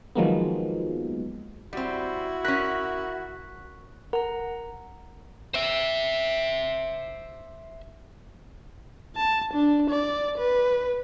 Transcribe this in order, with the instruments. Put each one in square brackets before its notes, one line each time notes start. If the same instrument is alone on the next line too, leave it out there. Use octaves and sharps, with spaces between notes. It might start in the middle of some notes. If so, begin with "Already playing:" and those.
[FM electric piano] D#3 F3 F#3 G#3 A#3 B3
[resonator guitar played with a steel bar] G3 C4 [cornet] E4 [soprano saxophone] F#4
[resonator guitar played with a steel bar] C#4 A#4 [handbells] F#6 B6
[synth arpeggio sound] A#4 [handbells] F#5 A#5
[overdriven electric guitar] C5 E5
[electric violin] A5
D4
D5
B4